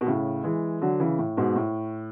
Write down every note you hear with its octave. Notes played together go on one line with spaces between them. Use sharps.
B2
A2 C#3
E3 G#3
D3 F#3
C#3 E3
A2
G#2 B2
A2